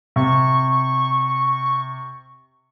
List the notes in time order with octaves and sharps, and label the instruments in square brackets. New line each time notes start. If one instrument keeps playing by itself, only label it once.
[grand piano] C3 [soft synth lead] C#6